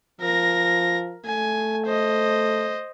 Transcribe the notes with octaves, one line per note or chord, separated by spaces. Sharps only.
F3 A#4 A#6
A3 G#5
C5 D#5